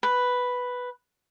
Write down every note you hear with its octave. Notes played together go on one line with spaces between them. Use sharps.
B4